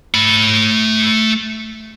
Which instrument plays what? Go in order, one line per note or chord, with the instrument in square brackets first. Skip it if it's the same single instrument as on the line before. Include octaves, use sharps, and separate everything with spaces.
[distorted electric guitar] A3 B5